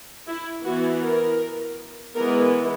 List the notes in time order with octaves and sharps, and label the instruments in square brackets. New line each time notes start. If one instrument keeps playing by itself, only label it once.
[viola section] E4
E3 B3 F#4
A#4
E3 G#3 B3 A#4